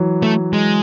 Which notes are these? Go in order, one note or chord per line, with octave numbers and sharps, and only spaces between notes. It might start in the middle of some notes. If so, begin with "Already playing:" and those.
Already playing: E3 F#3
A3
G#3